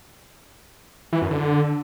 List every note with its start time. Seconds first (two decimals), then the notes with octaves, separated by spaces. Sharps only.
1.13 E3
1.22 F#2
1.31 D3